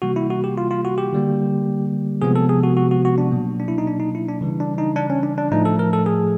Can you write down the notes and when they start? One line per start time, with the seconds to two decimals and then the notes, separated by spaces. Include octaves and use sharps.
0.02 C3 E3 G3 A#3 F#4
0.16 E4
0.30 F#4
0.44 G4
0.58 F4
0.71 F4
0.85 F#4
0.98 G4
1.13 D3 G3 A#3
2.22 C3 F3 G#3 B3 G#4
2.36 A4
2.49 G#4
2.63 F#4
2.77 F#4
2.91 F#4
3.05 F#4
3.18 D4
3.32 B2 F#3 A#3
3.60 D4
3.68 E4
3.78 D#4
3.87 D4
4.00 D#4
4.15 E4
4.28 D4
4.41 C#3 E3 G3
4.60 D4
4.78 D#4
4.96 D4
5.10 C#4
5.23 D4
5.38 D4
5.51 A2 F3 A3 D#4
5.65 A4
5.79 A#4
5.93 A4
6.06 G#4